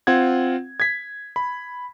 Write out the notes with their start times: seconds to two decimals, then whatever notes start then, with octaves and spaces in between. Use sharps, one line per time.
0.07 C4 F4 F#5 G#6
0.80 G#6 B6
1.36 B5